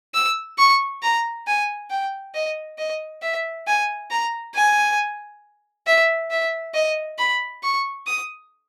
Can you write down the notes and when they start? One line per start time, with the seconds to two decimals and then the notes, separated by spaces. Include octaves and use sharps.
0.14 E6
0.58 C#6
1.03 A#5
1.47 G#5
1.90 G5
2.35 D#5
2.78 D#5
3.22 E5
3.67 G#5
4.10 A#5
4.55 G#5
5.87 E5
6.31 E5
6.74 D#5
7.18 B5
7.63 C#6
8.07 D#6